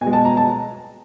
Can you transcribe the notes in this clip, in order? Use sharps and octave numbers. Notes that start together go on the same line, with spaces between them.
B2 G#5
G#3
A5
A#5
A5